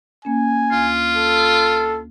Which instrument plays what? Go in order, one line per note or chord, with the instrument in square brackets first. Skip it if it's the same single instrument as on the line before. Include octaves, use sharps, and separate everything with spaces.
[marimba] A#3 C#4 [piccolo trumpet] G#5
[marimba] D2 [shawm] F4
[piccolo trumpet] A4